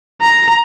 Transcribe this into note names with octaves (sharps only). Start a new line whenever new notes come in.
A#5